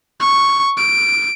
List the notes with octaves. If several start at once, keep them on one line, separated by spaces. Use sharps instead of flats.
C#6
D7